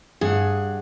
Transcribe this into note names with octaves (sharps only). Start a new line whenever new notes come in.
G2 G#4 F#5